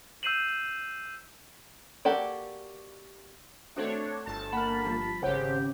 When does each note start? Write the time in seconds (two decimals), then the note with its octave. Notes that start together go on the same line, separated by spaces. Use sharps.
0.23 E6 G6 C7 D#7 E7 F#7
2.05 A#3 F#4 G4 A4 D5
3.76 A3 C4 D4 F#4 C#5
4.26 G1 A5
4.52 A#3 F#5 B5 F6
4.84 F3 G3
5.22 G#1 C#3 G4 C5 F#5